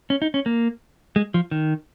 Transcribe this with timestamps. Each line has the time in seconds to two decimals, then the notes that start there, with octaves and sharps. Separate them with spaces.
0.10 C#4
0.22 D#4
0.34 C#4
0.46 A#3
1.16 G#3
1.34 F3
1.51 D#3